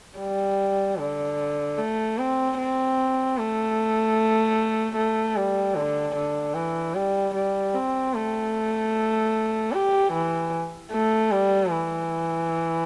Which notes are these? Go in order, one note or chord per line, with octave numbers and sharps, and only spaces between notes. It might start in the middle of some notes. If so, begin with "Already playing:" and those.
G3
D3
A3
C4
C4
A3
A3
G3
D3
D3
E3
G3
G3
C4
A3
G4
E3
A3
G3
E3